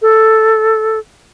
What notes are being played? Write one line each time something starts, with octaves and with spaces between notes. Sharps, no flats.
A4